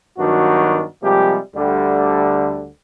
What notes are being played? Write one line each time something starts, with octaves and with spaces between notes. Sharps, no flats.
G2 D#3 F#3 B3 D4 F#4
C3 F3 G3 G#3 A#3 G4
D2 D3 G3